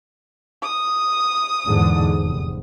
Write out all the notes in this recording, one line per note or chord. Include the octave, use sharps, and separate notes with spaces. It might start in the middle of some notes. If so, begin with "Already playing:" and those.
D#6
E2 G#2 D3
F1